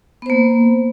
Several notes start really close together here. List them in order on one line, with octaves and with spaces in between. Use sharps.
B3 C5 A#3